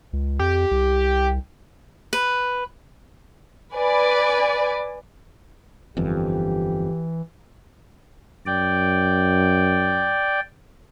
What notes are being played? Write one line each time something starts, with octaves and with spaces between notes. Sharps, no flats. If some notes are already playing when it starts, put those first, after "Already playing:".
C#2
F2 G4
C2
B4
B4 D5 G#5
G1 F2 E3 G4
F#2 D5 G5